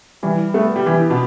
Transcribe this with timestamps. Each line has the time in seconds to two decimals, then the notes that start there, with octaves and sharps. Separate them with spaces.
0.23 E3 G3
0.54 A3 B3
0.76 G3
0.86 E3 G4
1.10 B2